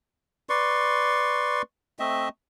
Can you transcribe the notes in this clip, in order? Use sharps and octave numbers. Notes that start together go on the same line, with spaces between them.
B4 D5 C6 C#6
A3 C4 D#5 E5